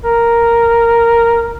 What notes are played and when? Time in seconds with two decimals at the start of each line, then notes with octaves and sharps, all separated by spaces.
0.04 A#4